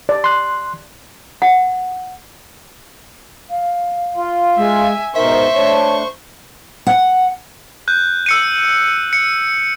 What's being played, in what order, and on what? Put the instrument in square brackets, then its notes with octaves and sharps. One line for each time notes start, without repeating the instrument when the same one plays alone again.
[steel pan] D5
[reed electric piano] C6 F#6
[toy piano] F#5
[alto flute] F5
[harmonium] F4
[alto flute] G#3 [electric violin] E5 G#5
[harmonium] G#2 B2 D#4 [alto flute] A#4 [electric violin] C5 C#6 [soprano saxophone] E5
[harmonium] A3 D4 [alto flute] C#5
[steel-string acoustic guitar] F#5
[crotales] F#6 G6
E6 C#7 D#7
C#7